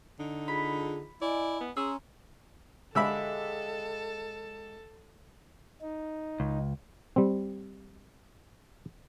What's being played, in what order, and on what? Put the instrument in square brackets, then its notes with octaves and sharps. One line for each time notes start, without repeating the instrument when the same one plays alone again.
[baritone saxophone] D3 [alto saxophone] D#4
[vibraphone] F4 G#4 [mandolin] B5
[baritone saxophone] E4 [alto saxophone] D5 [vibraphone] D#5 G#5
[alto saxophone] B3
[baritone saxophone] C#4 [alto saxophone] G#4 [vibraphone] A#5 C6 [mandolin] E6
[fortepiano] D3 E5 B5 [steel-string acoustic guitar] G#3 G4 F5 [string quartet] A4
[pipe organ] D#4
[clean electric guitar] C#2
[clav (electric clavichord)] G3 C4